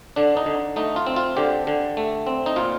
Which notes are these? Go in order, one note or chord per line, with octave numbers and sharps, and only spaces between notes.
D3 D4
D#4
D3
A3 D#4
F4
C4
F4
D3 G4
D3
A3
C4
D#4
A#2 F4